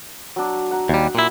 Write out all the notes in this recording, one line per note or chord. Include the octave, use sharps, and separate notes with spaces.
F#3 D4
F#5 A#5
D#2 G3
A#2 E4